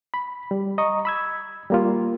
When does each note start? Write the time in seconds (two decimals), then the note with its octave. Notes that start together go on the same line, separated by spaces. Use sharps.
0.14 B5
0.51 G3
0.78 D#5 A#5 C#6
1.05 B5 E6 G#6
1.70 G3 A#3 F4